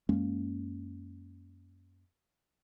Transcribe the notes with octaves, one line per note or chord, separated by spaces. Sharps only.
F#2 G#3 A#3 C#4